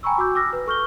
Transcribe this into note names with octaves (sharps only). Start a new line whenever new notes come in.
G5 G#5 A#5 B5 C#6 E6
F#4 D6 E6 G6
D6 E6 F6 A#6
B4
A4 C#6 F6 G6 G7